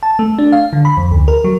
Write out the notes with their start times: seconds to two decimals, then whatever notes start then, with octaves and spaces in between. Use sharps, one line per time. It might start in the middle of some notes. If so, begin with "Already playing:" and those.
0.03 A5
0.19 A3
0.39 D4
0.52 F5
0.73 D3
0.85 B5
0.97 F2
1.11 D2
1.28 A#4
1.44 F#3